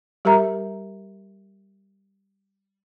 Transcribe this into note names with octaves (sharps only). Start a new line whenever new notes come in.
G3 G4 A#4 E5 A#5